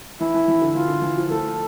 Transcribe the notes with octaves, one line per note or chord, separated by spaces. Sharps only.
E3 E4
E3
E3
D3
E3 F4
D3
E3
F3
A3 A4